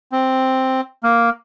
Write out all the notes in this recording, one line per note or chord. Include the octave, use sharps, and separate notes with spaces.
C4
A#3